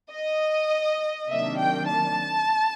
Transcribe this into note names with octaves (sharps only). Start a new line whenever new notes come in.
D#5
C3 D#3 F#3 A#3 D4 E5
G5
A5